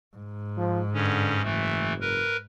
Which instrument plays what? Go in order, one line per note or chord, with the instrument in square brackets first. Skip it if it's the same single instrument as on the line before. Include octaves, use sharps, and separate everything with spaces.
[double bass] G#2
[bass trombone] F3
[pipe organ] G2 C#4 [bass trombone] D3
[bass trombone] F#1 [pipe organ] E3 A3
[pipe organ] A#4 B4